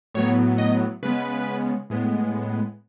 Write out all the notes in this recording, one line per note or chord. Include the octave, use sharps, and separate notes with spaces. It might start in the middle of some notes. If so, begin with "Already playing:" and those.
A2 F#3 B3 C#5
D#5
C#3 G#3 B3 B4
A2 G#3 B3